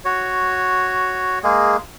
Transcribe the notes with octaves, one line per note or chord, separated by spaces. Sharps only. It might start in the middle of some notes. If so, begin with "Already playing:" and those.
F#4 C#5
G#3 A#3 G#4